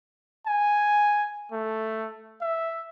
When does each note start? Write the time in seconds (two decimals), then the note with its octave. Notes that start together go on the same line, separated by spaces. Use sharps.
0.47 G#5
1.52 A3
2.41 E5